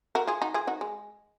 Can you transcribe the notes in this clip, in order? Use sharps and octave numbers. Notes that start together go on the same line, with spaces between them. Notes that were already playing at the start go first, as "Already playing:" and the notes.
F#4 A#4
F4 G#4
D#4 F#4
F4 G#4
D#4 F#4
G#3